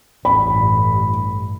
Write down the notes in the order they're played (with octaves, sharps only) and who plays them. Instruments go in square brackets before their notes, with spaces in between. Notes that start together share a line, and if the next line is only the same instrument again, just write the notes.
[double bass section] A1 G2 [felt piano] B5